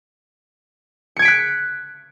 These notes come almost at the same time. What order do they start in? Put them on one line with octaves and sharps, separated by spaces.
C#7 G#6 D7 B6 F#6